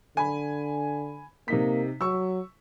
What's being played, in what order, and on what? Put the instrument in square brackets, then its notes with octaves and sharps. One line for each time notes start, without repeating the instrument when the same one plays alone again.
[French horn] D3 [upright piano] G#5 B5
[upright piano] C3 D#4 B6 [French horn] A#3
[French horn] F#3 [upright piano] C#6 E6